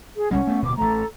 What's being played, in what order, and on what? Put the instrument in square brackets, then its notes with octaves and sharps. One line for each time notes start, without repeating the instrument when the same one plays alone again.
[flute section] G#4
[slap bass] C2 G3 G#3 [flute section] C#4 F#5
[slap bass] A3 B3
[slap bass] D1 B2 B3 [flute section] D6
[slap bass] A1 A3 [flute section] A4 A#5